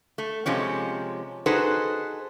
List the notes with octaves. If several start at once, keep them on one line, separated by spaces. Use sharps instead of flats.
A3
C3 F3 G#3 C#4
D#4 F#4 G#4 A4 B4 C5